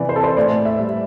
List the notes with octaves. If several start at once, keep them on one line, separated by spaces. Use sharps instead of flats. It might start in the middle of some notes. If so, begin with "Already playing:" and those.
Already playing: C3 E3 D5
C5
A4
C5
A2 D5
E5
G3